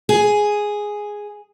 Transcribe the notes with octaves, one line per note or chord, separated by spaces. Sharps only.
G#4